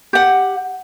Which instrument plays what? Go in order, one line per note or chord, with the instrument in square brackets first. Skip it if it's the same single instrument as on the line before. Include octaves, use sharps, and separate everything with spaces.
[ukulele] G4 F#5